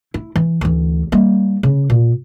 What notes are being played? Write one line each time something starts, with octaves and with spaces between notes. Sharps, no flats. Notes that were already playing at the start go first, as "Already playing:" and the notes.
E4
E3
D2 E3
G3 A#3
C#3
A#2